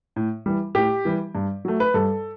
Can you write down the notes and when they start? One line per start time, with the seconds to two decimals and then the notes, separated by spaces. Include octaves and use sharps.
0.16 A2
0.46 E3 G3
0.75 A2 G4
1.05 E3 G3
1.35 G2
1.65 F#3 A3
1.80 B4
1.94 G2 A4